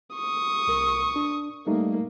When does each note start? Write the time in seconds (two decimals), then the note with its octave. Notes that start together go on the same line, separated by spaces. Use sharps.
0.15 C#6 D#6
0.68 C2 A#4
1.16 D4
1.67 G3 A3 A#3 D#4